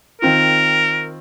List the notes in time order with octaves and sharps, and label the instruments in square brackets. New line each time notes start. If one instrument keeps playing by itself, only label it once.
[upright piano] D#3 C4 F4 [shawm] A#4